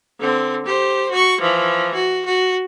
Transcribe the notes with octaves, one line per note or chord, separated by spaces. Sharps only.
D3 C4
G4 C5
F#4 C#6
E3 F3
F#4
F#4